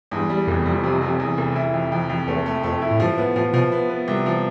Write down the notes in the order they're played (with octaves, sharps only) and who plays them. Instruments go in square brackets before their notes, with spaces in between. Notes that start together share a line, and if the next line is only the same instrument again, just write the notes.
[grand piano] E2 [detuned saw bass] G2
[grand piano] G3
[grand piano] F1 [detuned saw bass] F2
[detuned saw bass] E2
[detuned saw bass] F2 [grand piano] G3
[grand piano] C3
C3
E2
F1
E4
F2
F2
F2
[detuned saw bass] E2 [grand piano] A3
[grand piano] A3
[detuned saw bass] F2 [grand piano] A3
[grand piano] E4
[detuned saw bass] A2
[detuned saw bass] G2 [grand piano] F3
[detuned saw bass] A2 [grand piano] B3
[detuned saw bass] A2 [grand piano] F3
[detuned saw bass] B2 [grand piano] F3
[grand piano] B3
B3
C2
F3